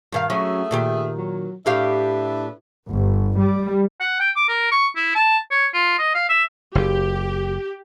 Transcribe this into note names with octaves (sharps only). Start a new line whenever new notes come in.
G2 D#3 F5
F#3 A3 C#4 G#4 E5
A#2 D#3 G4
F#3
A2 D4 G4 B4 E5 F5
G1
G3
F#5
G5
D6
A#4
C#6
E4
A5
C#5
F4
D#5
F5
E5
F#1 G4